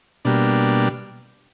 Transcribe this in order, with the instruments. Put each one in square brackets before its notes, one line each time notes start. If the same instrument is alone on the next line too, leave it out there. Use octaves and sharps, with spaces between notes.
[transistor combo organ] B2 G3 A#3 D4